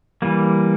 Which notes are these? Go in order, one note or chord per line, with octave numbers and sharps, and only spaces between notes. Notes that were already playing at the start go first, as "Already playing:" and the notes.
E3 G3 A#3